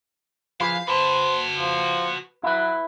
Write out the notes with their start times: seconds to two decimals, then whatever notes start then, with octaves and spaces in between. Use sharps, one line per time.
0.60 F3 G#4 B4 F5
0.88 F#4 B4 C5 A5
1.57 F3
2.43 F#3 E4 B4